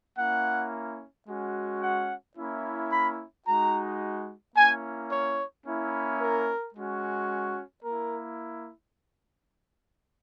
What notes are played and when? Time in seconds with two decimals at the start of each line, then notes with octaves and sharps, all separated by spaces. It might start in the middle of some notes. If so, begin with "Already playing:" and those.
0.18 A#3 C#4 E4 F#5
1.28 G#3 C#4 F#4
1.82 F#5
2.37 A#3 C#4 E4
2.92 B5
3.46 G#3 D#4 F#4 A#5
4.55 A#3 C#4 E4 G#5
5.11 C#5
5.65 A#3 C#4 E4
6.20 A#4
6.75 G#3 C#4 F#4
7.84 A#3 E4 A#4